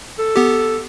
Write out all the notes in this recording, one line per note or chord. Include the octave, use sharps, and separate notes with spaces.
A4
B3 G4